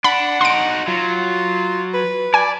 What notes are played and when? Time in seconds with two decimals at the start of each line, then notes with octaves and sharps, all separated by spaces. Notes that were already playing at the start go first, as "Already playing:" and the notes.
0.04 D4 F#5 B5
0.41 D#4 F#4 C6 D7
0.87 F#3 F4
1.94 B4
2.34 D5 G#5